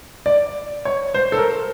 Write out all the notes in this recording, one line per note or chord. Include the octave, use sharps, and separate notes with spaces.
D5
C#5
C5
A4
A#4